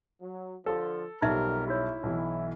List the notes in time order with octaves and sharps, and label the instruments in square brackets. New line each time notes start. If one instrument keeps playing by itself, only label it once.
[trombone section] F#3
[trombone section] D3 F3 [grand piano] A4
[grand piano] B1 G3 [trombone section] F2 C3 A#4 [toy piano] D#4 E5
[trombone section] E4 [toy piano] F#4 C#5
[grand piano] B1 E3